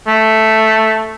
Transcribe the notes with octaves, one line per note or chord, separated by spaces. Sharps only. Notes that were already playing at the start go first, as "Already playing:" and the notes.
A3